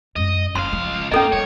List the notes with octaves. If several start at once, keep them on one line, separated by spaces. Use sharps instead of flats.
F#2 G#3 D#5
F#1 C#2 F5 C6
F3
G2 A#3 C#4 D#4 A4 D#5
G3 C#5